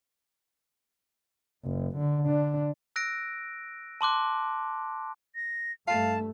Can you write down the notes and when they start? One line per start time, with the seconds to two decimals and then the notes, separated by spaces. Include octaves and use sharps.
1.65 F#1
1.97 D3
2.26 D3 D4
2.96 E6 F#6 A#6 D7
4.01 A5 C6 D6 F#6
5.35 A#6
5.87 G2 A3 F5 A5